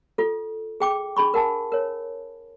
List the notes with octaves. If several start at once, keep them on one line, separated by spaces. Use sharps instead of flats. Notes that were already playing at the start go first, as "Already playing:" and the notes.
F4 A4
G#4 G5 D6
D4 G#4 B5 C#6
A#4 F#5 G#5 A5
A#4 C#5